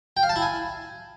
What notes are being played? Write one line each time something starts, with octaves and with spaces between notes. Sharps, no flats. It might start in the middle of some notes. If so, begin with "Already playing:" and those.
G5
F5
A5
E4
G#5